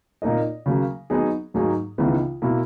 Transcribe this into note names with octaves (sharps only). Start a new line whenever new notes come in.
A#2 A#3 D#4 A#4 D#5
C#3 F#3 A#3
F#3 B3 D#4 G#4
G#2 F#3 A#3 D#4 G#4
C#2 C#3 E3 B3 D#4
B2 A#3 E4